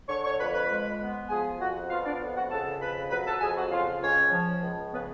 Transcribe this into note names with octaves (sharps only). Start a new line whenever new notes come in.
D3 C#5 C#6
C#5 C#6
F2 B4 B5
B4 B5
G#3
B3
F3 G#4 G#5
F2 F#4 F#5
B3 F4 F5
D4 D5
F2
F#4 F#5
C#3 A4 A5
F2 B4 B5
F#3 B4 B5
A4 A5
F2 G#4 G#5
F#4 F#5
C#3 F4 F5
C#2 C#4 C#5
F3
C#2
C#3 B3 B4